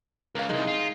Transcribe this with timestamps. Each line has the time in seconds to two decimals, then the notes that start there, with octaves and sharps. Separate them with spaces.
0.35 C#2 A#4 F5
0.49 C2 F#2 G#3 D#4
0.67 F4